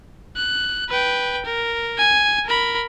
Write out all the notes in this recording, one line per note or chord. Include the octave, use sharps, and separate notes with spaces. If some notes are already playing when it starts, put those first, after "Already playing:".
F#6
B4 G5
A#4
G#5
A#4 B5